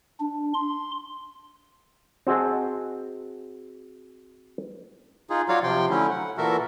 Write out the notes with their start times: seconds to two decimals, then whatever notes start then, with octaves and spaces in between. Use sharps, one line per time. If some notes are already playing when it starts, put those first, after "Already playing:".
0.20 D4
0.54 C6
2.27 C4 F#4 G#4 D#5 A5
5.30 D#4 F4 G#4
5.49 F#3 F4 F#4 C#5 D5 F5
5.64 C3 F3 G5 C6
5.90 D3 F#3 A3 C#4 E4
6.10 F#5
6.38 A#2 E3 F#4 A4 A#4 E5